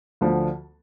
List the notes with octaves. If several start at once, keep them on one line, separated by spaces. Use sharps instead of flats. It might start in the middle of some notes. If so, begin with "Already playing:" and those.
D2 D3 F3